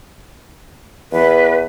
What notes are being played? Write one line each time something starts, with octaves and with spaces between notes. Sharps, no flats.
E2 B4